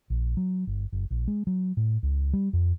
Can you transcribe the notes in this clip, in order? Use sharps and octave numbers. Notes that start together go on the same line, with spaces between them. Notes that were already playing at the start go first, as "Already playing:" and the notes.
A#1
F#3
G1
F#1
A#1
G#3
F#3
A2
C#2
G3
F2